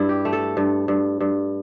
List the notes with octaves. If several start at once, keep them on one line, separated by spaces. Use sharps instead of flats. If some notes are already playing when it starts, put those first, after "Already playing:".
Already playing: G2 E4
G4
A3
A4
G2
G2
G2